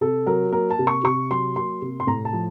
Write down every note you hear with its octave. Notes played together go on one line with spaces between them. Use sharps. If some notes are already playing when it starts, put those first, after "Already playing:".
C3 A4
F#3 A#4
A#3 A#4
A5
C3
C#6
C3 C#6
F#3 C6
A#3 C6
C3
C6
A2 A#5
A5
F3